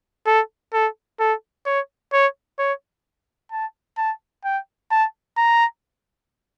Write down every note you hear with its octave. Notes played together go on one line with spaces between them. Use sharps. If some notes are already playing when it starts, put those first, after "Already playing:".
A4
A4
A4
C#5
C#5
C#5
A5
A5
G5
A5
A#5